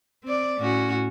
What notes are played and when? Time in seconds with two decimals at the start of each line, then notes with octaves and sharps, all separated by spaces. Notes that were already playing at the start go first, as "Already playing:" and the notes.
0.24 C4 D5
0.58 A2 C#4 F#4